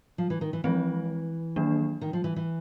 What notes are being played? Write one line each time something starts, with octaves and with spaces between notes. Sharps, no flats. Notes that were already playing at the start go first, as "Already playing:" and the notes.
F3
E3
D#3
E3
E3 F3 G#3 C4
D#3 F#3 A#3 D4
D#3
F3
E3
E3